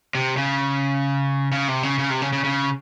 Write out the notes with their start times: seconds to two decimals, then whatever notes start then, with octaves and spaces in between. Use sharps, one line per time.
0.15 C3
0.37 C#3
1.52 C#3
1.68 C3
1.83 C#3
1.99 C#3
2.10 C3
2.22 C#3
2.33 C#3
2.44 C#3